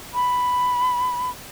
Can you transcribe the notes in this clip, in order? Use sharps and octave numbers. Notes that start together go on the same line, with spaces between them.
B5